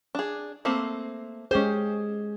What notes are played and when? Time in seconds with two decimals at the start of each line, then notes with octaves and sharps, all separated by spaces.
0.15 D4 G#4
0.65 A3 A#3 C4
1.51 G#3 C#4 G4 G#4 C5